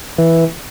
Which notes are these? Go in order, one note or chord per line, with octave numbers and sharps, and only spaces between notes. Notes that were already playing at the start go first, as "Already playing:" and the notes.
E3